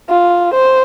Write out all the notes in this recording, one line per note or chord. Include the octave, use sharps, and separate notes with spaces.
F4
C5